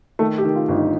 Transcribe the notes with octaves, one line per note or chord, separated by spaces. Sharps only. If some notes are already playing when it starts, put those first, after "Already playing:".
D#3 A3
G4
D#3
F4
G1
D#4